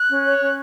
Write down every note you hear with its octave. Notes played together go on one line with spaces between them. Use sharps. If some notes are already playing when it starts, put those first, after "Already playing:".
Already playing: F#6
C#4
C#5
C#4